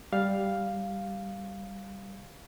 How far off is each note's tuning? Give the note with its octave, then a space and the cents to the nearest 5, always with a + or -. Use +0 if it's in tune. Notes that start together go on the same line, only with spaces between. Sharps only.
G3 +0 F5 +0